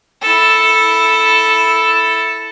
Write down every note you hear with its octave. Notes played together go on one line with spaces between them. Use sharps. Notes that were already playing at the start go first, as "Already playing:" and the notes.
E4 A4